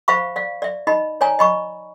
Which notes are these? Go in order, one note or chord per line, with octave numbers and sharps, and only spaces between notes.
C5 E5 F5 B5 C#6
D5 F5
D5 E5
D#4 D#5 B5
C#5 D5 G#5 A#5
D#5 B5 C#6